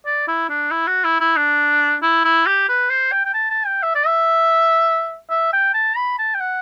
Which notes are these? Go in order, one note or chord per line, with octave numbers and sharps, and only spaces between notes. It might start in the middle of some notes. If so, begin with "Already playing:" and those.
D5
E4
D4
E4
F#4
E4
E4
D4
E4
E4
G4
B4
C5
G5
G5
A5
A5
G5
E5
D5
E5
E5
G5
A5
B5
A5
G5
F#5